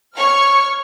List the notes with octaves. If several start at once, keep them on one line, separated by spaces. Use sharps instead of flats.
C#5 C#6 F6